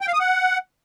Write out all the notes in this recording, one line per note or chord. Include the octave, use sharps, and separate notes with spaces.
G5
F5
D#6
F#5